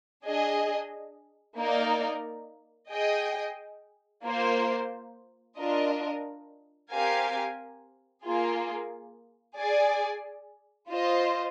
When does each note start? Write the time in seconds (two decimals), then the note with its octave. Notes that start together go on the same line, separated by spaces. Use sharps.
0.24 D4 G#4 D#5
1.57 A#3 D#4 A#4 D5
2.91 G#4 D#5 G5
4.24 A#3 F4 C5
5.58 D4 F4 A#4 D#5
6.91 C4 G4 A#4 F5 G#5
8.23 A#3 F4 G#4
9.57 G#4 D5 G#5
10.90 F4 C5 D#5